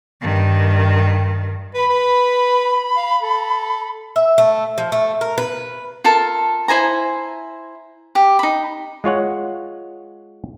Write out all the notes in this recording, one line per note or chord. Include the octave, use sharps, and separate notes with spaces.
G2 D#3
B4 B5
B4
F5
A4
E5
A3
F3
A3
A#4
B4
F4 A4 A#4 A5
E4 C5 G#5 A#5
G4
D#4 B5
G#3 F4 C#5 F#5